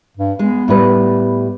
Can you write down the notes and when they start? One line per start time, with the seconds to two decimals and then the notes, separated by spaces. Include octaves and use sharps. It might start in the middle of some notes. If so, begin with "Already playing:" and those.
0.17 G2
0.39 G#3 B3
0.68 A2 G3 B4